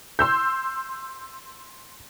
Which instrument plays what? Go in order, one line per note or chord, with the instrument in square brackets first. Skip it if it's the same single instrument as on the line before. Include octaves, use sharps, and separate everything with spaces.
[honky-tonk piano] C6 E6 G6